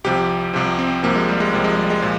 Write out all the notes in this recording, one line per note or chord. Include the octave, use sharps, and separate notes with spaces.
C2 C3 F3 G4
C2 C3 F3 G4
C4
C2 C3 F3 A#3
G#3
G3
G#3
C2 C3 F3 A#3
G#3
G3
G#3
A#2 F3